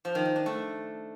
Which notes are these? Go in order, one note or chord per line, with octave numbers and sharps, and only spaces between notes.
F3
D#3
D#4
D4
A3